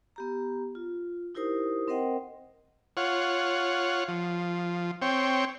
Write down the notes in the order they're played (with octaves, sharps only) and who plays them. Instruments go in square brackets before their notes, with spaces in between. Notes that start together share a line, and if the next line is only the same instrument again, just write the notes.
[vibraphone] B3 G4 A#5
F4
D#4 E4 G4 A#4 C5 D#6
C4 A#4 C5 D#5 F#5 G5
[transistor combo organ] F4 C#5 F#5
F3
C4 C#5 G5